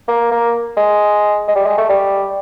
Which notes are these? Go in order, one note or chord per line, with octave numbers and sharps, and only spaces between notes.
A#3
A#3
G#3
G#3
G3
G#3
A3
G3